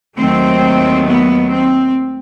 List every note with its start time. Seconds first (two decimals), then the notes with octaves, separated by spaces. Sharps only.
0.18 D#2 D#3 F#3 A3 C4
1.07 B3
1.52 C4